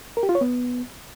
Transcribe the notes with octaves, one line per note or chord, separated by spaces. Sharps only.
A#4
G4
F4
C#5
B3